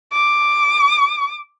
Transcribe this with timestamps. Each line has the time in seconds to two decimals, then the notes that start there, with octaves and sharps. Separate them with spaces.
0.13 D6